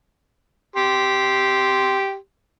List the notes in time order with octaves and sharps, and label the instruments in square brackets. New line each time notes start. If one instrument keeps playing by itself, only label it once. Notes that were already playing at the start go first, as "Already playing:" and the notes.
[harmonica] G4 C6